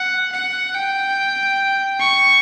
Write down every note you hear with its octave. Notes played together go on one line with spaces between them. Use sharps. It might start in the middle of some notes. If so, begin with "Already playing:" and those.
Already playing: F#5
F#5
G5
C#6